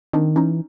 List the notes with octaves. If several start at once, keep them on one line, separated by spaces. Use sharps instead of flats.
D#3 C4 D4
E3 C#4 D#4